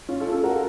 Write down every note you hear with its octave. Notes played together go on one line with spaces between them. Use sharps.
C#4 F4
F4 A4
F4 A4
F#4 A#4